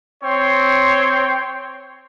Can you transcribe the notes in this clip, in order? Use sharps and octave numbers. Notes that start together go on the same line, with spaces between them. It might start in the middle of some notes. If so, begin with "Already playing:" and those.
C4 C#5 G5 C6